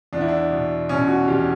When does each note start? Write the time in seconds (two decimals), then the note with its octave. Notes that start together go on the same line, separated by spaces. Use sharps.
0.13 E2 D4
0.21 E4
0.28 D4
0.51 B2
0.89 B2 C#4
1.08 F#4
1.28 E2 G4